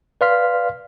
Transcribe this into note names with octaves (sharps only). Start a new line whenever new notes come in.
B4 D5 F5 C6 F6 B6